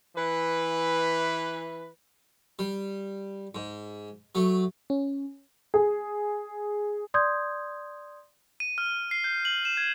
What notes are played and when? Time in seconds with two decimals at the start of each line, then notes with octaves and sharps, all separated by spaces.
0.16 E3 B4
2.59 G3
3.55 G#2
4.35 F#3 A3
4.90 C#4
5.74 G#4
7.14 D5 C6 D#6 G6 G#6
8.60 D#7
8.78 F6
9.11 C7
9.24 G6
9.45 F#7
9.65 E7
9.77 G#6